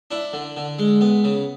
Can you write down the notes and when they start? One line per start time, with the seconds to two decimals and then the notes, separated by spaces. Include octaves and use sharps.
0.11 D4 E4
0.33 D3
0.57 D3
0.79 G#3
1.01 B3
1.24 C#3